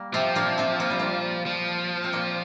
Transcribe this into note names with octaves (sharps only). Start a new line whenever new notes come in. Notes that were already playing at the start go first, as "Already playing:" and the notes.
Already playing: G3 A#3
C3 F3 C4
A#2 A#3
C3 C4
A#3
G3
A#2 A#3
F3
C4
A#2 A#3